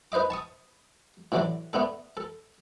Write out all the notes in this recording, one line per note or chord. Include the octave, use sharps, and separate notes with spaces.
D#4 B4 C5 D#5 D6
A5 C#6 D#6
A2 D3 E3 F#3 D4 D6
A3 B3 D4 A4
A4